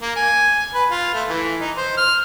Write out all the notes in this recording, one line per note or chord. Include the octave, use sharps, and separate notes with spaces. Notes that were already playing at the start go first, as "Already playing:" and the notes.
A#3
G#5
B4
F4
A3
E3
D#4
C5
F6